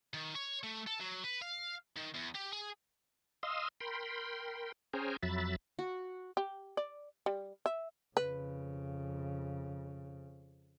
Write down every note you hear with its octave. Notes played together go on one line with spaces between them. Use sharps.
D#3
C#5
A3
A4
F#3
B4
F5
D#3
E2
G4
G#4
D#5 F5 C6 D#6 E6
A#4 G5 B5 C6
C#4 G#4 C5 G5 G#5 A#5
F2 F#3 E5 B5 A6
F#4
G4
D5
G3
E5
F2 C#3 B4